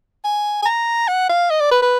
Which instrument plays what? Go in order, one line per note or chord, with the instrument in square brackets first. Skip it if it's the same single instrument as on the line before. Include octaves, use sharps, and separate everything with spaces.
[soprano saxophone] G#5
G#5
A#5
F#5
F5
D#5
D5
B4
B4